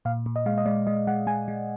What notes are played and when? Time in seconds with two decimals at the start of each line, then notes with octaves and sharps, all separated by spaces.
0.05 A#2 F5
0.26 A#2
0.36 D#5
0.46 G#3 F5
0.58 D#5
0.66 G#3 D5
0.87 G#3 D#5
1.07 G#3 F#5
1.27 G#3 G#5
1.48 G#3